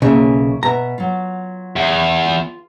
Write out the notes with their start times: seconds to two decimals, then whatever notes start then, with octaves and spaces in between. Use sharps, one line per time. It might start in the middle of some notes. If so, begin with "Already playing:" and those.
0.02 B1 C#3 A#3 E5 G#5
0.63 B2 E5 A#5
0.98 F#3 F4
1.76 E2
2.26 F4